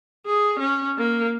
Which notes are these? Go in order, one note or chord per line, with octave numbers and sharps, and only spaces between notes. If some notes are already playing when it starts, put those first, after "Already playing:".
G#4
C#4
A#3